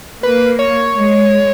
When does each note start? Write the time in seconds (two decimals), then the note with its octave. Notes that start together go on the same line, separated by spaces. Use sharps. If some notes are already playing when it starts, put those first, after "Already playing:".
0.23 A#3 B4
0.59 C#5
0.95 G#3